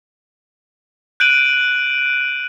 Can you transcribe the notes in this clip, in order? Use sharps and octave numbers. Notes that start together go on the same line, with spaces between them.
F#6 G6 D7 D#7 F#7